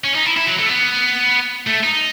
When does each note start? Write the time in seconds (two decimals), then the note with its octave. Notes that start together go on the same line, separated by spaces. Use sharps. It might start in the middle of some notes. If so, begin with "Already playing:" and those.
0.04 C#4
0.15 D#4
0.26 E4
0.37 E4
0.47 F#3
0.59 A3
0.69 B3
1.67 A3
1.83 D#4